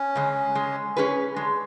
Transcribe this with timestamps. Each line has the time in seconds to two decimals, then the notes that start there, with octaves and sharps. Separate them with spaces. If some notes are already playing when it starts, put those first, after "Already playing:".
Already playing: C#4
0.15 C#3 G#3
0.55 G#3
0.96 C#4 G#4 B4
1.36 G#3 D4